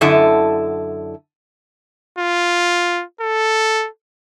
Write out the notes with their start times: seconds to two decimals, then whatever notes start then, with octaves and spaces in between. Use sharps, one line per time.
0.01 F#2 D3 E4 A4 D#5
2.19 F4
3.21 A4